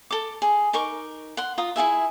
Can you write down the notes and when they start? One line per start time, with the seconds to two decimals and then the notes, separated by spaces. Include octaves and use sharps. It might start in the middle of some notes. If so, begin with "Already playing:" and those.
0.11 A4 D6
0.42 G#4
0.73 D#4 A#4 C#6 D6
1.37 F#5 C6
1.58 F4 A#5 D#6
1.76 E4 F#4 G#4 E5